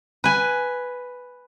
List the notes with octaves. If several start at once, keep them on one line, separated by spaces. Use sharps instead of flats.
B4 G#5